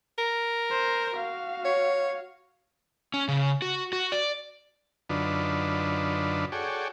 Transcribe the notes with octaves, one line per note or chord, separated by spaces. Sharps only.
A#4
C5
F#4 F5
C#5
C#4
C#3
F#4
F#4
D5
F#2 D3 D4 D#4 F4 B4
F#4 G#4 A4 C#5 D5 G5